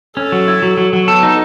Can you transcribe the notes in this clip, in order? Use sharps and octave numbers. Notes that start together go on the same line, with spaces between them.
C#4 A4
F#3
E4
F#3
F#3
F#3
B3 A4
D#4